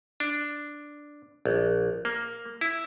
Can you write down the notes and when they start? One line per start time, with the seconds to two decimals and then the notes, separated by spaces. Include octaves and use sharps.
0.20 D4
1.45 A#1
2.05 A#3
2.61 E4